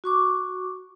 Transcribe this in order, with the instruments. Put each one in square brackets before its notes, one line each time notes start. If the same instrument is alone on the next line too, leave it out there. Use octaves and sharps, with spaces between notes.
[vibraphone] F#4 C#6 D6